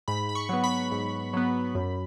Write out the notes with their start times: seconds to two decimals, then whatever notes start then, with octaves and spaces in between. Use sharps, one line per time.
0.08 G#2 B5
0.29 B5
0.35 C#6
0.49 F#3 B3
0.64 B5
0.92 G#2
1.33 F#3 B3
1.75 F#2